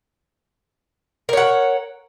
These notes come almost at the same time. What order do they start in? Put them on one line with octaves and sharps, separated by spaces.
A#4 C#5 F#5